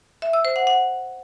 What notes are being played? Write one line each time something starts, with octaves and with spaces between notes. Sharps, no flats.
E5
E6
C5
F#5
F#5